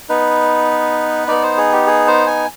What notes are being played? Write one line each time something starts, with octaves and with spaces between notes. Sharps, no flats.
B3 D#4 B4
B3 D#4 D5
C5
G#4
G4
G#4
C5
G#5